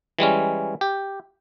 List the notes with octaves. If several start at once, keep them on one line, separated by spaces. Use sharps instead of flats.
E3 G3 G#3 C#4
G4